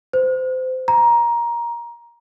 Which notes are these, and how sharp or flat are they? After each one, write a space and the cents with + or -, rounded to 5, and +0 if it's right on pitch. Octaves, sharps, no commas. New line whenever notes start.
C5 -25
A#5 +15